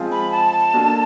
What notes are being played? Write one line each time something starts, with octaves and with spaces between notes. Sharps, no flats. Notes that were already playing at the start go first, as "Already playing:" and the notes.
Already playing: F3 G#3 C4 F4 G#4
B5
A5
A#3 D4 F#4 A4